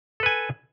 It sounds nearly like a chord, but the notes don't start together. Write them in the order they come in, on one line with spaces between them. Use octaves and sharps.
A4 B4 G#5